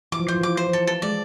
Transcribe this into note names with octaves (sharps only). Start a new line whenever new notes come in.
E3 D6
F3
E3 C5
F3
E3 D6
C5
F3
E3 A4
A4
G#3 D5